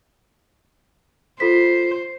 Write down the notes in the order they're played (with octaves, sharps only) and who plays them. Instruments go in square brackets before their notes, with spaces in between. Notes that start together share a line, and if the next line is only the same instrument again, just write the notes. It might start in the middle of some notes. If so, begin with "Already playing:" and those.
[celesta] F4 A4 B6 [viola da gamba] C5